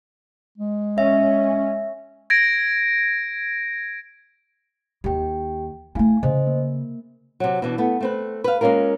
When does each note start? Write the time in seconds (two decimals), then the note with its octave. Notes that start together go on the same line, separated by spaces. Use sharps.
0.58 G#3
0.98 C#4 E5
2.30 G#6 A#6 D7
5.04 D#2 D#3 G4 G5
5.95 A3 E4 F5 G#5
6.23 C#3 C5 D#5
6.47 A#3
7.40 C3 F#3
7.62 B2 E3 D4
7.78 A3 B3
8.01 A3 C4 B4
8.44 B4 F5
8.61 G#3 A#3 C#4 F4 A#4